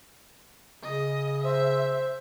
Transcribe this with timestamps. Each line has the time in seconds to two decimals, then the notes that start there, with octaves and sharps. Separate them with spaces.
0.83 C#3 D#5
1.44 C5 E5